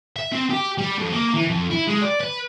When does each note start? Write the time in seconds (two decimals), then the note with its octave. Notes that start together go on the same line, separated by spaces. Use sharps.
0.16 E5
0.32 C4
0.50 G4
0.78 G3
0.98 F2
1.12 A#3
1.34 E3
1.48 F2
1.71 E4
1.87 G#3
2.02 D5
2.20 B4